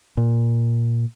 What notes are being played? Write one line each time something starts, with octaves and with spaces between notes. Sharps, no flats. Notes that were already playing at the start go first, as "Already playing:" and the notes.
A#2